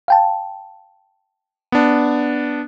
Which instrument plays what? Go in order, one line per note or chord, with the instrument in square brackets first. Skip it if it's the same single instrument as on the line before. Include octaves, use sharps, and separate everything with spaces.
[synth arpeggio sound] F5 G5 A5
[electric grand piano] B3 D4